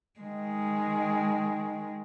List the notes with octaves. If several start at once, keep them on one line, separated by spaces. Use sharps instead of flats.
D#3 G#3